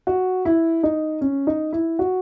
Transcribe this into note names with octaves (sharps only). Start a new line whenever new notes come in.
F#4
E4
D#4
C#4
D#4
E4
F#4